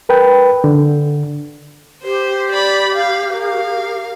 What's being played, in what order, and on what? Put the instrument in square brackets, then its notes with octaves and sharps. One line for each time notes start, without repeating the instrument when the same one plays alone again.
[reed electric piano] A#4 B4 G5
D3
[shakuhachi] G4 [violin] C5
[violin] D5 B5
F5
A#4 F5